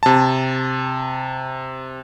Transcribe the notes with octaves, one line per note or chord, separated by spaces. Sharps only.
C3 A5